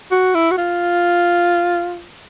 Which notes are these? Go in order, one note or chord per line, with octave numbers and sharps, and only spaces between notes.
F#4
E4
F#4
F4